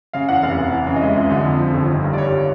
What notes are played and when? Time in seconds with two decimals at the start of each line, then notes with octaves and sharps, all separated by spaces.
0.13 C#3 F5
0.29 E2 F#5
0.43 F1 F5
0.58 F1
0.72 E3
0.87 C#3
0.96 D#5
1.01 G#3 E5
1.16 C#2
1.31 D3
1.45 F2
1.60 F3
1.74 G1
1.90 D#3
2.04 G2
2.13 D5
2.18 G3 C#5